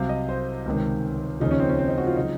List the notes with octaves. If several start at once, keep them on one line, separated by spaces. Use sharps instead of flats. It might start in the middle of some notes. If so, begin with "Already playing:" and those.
Already playing: C2 C3 F#3 F5
D#5
C5
C#2 C3 D#3
D#2 C#3 F3 D#4
C#4
C4
C#4
C4
D#4
F#4
F4
C#3 F#3 D#4